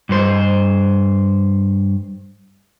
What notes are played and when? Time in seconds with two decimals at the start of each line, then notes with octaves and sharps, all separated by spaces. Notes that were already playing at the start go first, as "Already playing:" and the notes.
0.09 G2 C5